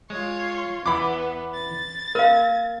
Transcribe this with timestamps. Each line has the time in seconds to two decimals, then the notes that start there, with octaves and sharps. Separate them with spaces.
0.10 G#3 F4 C#5
0.86 E2 E3 B3 B5 D6
1.54 A6
2.15 A#3 A#4 F5